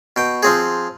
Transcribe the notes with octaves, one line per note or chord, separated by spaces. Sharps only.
B2 G5
F3 C4 G#4